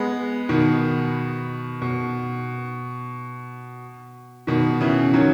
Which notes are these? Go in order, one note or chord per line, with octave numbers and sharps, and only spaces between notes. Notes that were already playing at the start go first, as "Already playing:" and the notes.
Already playing: G#3 B3
B2 D#3
B2
B2 D#3
C#3 E3
D#3 F#3